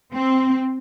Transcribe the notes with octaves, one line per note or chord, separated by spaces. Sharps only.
C4